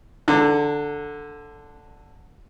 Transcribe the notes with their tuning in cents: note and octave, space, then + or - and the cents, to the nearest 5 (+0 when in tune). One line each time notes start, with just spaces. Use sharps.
D3 +0 A#5 -40